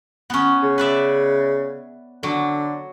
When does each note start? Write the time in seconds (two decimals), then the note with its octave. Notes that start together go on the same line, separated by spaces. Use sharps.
0.30 B3 C#4
0.63 C#3
0.78 B4 D5 E5
2.23 D3 F#3